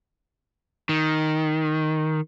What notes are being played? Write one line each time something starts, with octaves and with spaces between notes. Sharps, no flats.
D#3